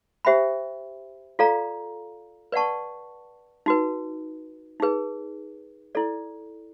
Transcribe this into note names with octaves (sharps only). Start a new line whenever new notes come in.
G4 C5 E5 G5 B5
F4 A4 D5 F5 A#5
B4 D5 F#5 A5 C#6
D#4 F#4 B4
D#4 G#4 B4
E4 A4 D5